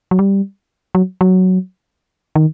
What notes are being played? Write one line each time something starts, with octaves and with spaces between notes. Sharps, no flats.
F#3
G3
F#3
F#3
D#3